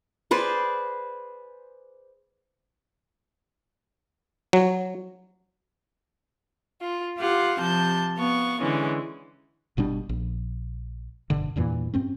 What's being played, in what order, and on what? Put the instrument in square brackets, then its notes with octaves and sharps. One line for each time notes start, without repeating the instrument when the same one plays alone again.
[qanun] G#4 B4 C5 D5
[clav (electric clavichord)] F#3
[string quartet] F4
F4 G4 F5 F#5
C3 F3 A5 G6
B3 F5 C#6
D3 E3 G#3 C#4
[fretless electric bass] G1 B2 G3 D4
A#1
F#1 G2 B2 D3
E2 G2 A#2 E3
G2 C4 C#4